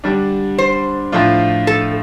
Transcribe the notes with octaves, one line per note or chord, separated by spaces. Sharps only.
D3 G3 D4
C5
A2 F3 A3 D4 F4
A4